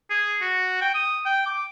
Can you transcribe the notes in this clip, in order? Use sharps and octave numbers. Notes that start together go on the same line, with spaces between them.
G#4
F#4
G5
D#6
G5
D6